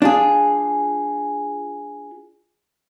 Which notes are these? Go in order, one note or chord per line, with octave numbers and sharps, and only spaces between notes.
D4 F4 G#4